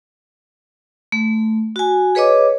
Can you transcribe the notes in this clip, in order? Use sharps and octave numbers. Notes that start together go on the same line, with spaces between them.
A3
F#4 G#5
G#4 B4 C#5 D#5 D6